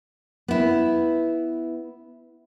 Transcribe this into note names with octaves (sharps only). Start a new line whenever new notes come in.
B3 E4